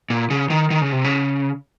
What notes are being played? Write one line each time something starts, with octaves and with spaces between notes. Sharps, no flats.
A#2
C#3
D#3
D#3
C#3
C3
C#3